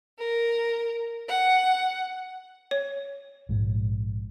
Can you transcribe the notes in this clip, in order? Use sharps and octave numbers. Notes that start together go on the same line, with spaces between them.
A#4
F#5
C#5
A#1 G#2